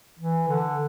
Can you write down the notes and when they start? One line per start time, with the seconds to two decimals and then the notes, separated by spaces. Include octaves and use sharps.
0.19 E3
0.48 D3